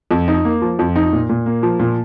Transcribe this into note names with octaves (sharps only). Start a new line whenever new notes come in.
F2
D#4
A#3
F3
F2
D#4
A#2
A#2
A#3
F3
A#2